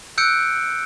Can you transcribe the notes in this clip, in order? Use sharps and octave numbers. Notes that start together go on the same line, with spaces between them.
E6 F#6 G6 C#7 D7